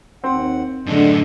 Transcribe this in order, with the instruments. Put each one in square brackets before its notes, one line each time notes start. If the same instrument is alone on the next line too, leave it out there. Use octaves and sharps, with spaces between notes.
[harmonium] D#2 F#5 [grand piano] C4
[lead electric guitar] F#2 A2 [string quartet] D3 [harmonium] G#3 D4